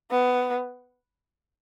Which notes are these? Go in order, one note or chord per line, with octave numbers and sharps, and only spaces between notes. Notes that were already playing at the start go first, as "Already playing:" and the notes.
B3